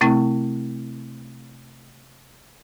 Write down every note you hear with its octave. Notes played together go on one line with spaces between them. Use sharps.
C3 A3 C4 E4